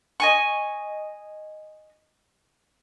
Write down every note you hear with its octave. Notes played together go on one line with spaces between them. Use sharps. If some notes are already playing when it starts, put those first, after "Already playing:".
D#5 G#5 C#6